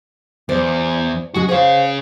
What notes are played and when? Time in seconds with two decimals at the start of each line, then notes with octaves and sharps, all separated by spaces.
0.49 E2 C5 D5
1.34 C#3 G#3 F#4 G#4
1.49 G#4 C5 C#5 F5